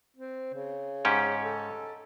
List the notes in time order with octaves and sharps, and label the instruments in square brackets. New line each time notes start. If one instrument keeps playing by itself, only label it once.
[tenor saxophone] C4
C#3
[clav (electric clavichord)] G#2 C#4 G4
[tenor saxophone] A4